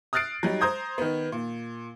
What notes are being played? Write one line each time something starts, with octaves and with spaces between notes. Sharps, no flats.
D#6 F6 F#6 A6 C7 D7
F#3 G3 D#4
C5 A#5 D#6 G6 G#6
D#3 B3
A#2